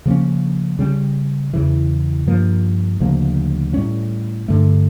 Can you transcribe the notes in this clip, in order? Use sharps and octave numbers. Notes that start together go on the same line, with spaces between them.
C#3 F3 A#3 C#4
C#3 G3 C#4
E2 C#3 E3
G2 F3 A#3
D2 C#3 F3 A#3
A2 G3 C#4
G2 D3 A3